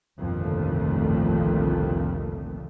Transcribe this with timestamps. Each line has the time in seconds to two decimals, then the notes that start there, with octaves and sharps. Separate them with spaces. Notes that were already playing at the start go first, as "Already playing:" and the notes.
0.21 G1 C2 F2 A#2 D#3 A3